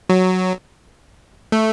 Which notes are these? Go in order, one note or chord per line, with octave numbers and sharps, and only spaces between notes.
F#3
A3